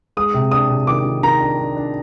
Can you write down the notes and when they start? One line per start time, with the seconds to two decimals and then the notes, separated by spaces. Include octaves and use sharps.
0.17 G#3 D#6
0.34 C3
0.51 D4 D#6
0.70 C3
0.87 D#3 D6
1.05 D#3
1.23 D#3 A#5
1.41 D4
1.59 D4
1.76 D4